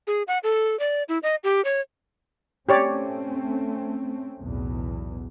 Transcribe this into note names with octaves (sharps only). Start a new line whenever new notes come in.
G#4
F#5
A4
D5
E4
D#5
G4
C#5
A3 C4 C#4 G4 C#5 D5
B1 E2 A2